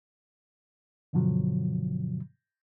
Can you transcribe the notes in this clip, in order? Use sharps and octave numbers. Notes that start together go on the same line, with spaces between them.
G2 B2 D3 F3 F#3